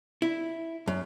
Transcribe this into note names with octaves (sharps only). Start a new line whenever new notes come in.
E4
F#2